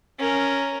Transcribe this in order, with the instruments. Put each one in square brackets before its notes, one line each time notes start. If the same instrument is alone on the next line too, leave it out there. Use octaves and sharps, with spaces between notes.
[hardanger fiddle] C#4 A#4